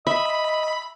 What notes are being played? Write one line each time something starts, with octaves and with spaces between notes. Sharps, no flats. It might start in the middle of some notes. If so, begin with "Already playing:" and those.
D#5 E5 B5